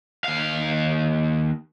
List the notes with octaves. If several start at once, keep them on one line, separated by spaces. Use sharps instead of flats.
D#2 F5